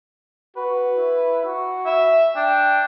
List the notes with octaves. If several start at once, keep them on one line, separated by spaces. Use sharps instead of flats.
F#4 B4
E4
F#4
E5
D4 G5